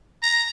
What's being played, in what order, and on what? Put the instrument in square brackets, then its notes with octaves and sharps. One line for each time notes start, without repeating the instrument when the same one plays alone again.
[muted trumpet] A#5